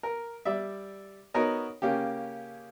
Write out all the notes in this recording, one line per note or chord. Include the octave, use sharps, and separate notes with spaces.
A#4
G3 D5 E5
B3 D#4 F#4 A#4 C#5 D#5
C#3 A#3 C#4 G4